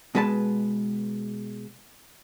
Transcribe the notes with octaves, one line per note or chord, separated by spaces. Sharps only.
B2 G#3 B4 D#5 A5